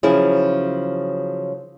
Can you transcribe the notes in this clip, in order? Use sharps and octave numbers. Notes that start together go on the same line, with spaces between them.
C#3 F3 F#3 E4 G#4